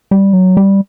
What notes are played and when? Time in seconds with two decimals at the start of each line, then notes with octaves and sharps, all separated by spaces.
0.11 G3
0.33 F#3
0.57 G3